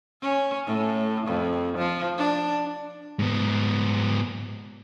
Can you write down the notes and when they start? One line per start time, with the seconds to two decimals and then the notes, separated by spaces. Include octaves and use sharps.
0.22 C#4
0.66 A2
1.27 F2
1.78 F3
2.18 D4
3.19 G#2 B3